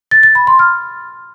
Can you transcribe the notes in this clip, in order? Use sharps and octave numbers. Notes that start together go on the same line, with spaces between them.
A6
A6
B5
C6
F6